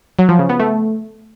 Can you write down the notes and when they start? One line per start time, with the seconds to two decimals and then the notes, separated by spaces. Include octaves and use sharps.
0.19 F#3
0.29 F3
0.39 C#3
0.49 B3
0.60 A3